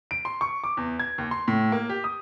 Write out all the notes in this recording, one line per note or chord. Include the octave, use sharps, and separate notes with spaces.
D7
C6
C#6
D6
E2
G#6
D#2
C6
A2
A#3
G4
D#6